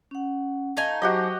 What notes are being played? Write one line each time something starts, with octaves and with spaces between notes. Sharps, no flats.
C#4 F#5
A3 D#4 F5 G#5
F#3 F#4 G4 C5 D#5 D6